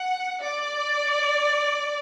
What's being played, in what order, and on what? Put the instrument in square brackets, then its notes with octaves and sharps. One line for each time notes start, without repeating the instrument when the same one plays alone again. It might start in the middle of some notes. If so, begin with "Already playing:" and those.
Already playing: [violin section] F#5
D5